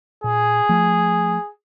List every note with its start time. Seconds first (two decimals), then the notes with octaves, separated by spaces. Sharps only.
0.24 A#2 G#4
0.69 F3 A3